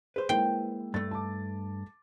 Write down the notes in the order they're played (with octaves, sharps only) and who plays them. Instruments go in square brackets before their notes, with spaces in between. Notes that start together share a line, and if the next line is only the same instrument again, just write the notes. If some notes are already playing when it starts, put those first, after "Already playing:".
[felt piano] G#4 [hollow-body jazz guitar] B4 C5
[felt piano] G#3 A#3 E4 [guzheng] G5
[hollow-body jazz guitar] G2 A3 [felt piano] A6
[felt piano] A5 D6